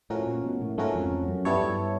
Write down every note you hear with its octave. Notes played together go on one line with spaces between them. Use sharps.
A2 F3 A3 C#4 F#4 A#4
A#2
B2
A2
G#2 F3 A3 C#4 F#4 A#4
F2
F2
F#2
G2 G3 B3 E4 A4 C#5
F#2
G2